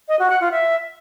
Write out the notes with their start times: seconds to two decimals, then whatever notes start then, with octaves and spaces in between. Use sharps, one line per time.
0.09 D#5
0.19 F#4
0.30 F#5
0.41 F4
0.52 E5